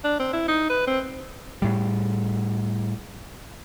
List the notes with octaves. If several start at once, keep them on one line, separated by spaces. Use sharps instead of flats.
D4
C4
E4
D#4
B4
C4
A2 G3